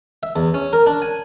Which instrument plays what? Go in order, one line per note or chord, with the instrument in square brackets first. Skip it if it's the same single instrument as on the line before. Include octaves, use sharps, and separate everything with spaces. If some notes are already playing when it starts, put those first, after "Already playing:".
[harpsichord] E5
E2
C#4
A#4
D4
G#5